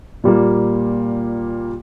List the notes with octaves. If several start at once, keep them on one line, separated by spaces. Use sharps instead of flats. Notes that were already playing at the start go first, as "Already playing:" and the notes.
A#2 G3 A#3